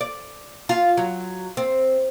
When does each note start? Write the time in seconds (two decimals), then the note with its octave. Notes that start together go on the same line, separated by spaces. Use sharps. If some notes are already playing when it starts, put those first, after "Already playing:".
0.01 D5
0.69 F4
0.97 F#3
1.57 C4